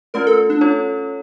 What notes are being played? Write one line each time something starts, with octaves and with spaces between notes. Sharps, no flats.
A3 C#4 F4 A#4
A4
D4
C#4 F4 A4 C#5